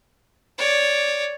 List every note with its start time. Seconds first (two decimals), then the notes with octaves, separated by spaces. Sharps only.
0.58 C#5 D5